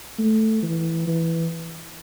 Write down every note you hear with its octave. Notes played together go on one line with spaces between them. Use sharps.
A3
E3
E3